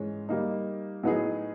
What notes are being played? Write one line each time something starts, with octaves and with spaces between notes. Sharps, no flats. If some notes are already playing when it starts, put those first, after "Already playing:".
Already playing: G#2 E3 G#3 C#4
G3 A#3 D#4
A2 F#3 B3 D#4 G#4